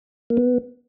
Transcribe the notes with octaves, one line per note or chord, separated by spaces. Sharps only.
A#3
B3